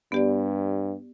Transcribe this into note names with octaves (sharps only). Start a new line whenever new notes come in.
G2 B3 G4 D5